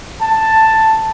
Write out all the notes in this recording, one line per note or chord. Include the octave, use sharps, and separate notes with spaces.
A5